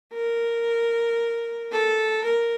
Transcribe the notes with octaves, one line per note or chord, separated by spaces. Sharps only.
A#4
A4
A#4